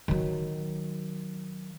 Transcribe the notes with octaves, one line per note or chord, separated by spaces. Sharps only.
D#3 F#3